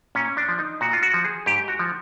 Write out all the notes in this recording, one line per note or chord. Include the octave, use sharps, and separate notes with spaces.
A#2 C#4
D4
F3
D#4
A#2 F#4
F4
F#4
F3
G#4
G#2 G4
F#4
F3